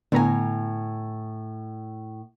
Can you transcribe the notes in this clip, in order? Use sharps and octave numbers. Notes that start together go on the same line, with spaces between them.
A2 D3 B3 G#5 A#5